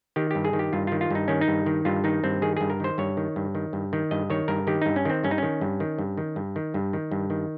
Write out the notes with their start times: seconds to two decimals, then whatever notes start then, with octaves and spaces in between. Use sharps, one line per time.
0.16 D#3 G4
0.31 G2 G4
0.44 G#4
0.53 D#3
0.59 G4
0.73 G2 F4
0.87 D#3 F4
1.01 F4
1.10 G2 D#4
1.28 D#3 C#4
1.41 D#4
1.48 G2
1.66 D#3
1.85 G2 F4
2.04 D#3 D#4
2.24 G2 C4
2.42 D#3 G#4
2.57 G2 G#4
2.70 A#4
2.80 D#3 C5
2.98 G2 C#5
3.17 D#3
3.36 G2
3.55 D#3
3.73 G2
3.93 D#3
4.11 G2 D#5
4.30 D#3 C#5
4.48 G2 A#4
4.67 D#3 G4
4.82 G2 D#4
4.96 C#4
5.05 D#3 C4
5.24 G2 C#4
5.31 D#4
5.38 D#3 C#4
5.61 G2
5.80 D#3
5.98 G2
6.17 D#3
6.36 G2
6.56 D#3
6.74 G2
6.93 D#3
7.12 G2
7.30 D#3